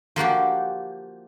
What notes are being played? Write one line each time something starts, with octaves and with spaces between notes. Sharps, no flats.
F3 A#3 F#4 G4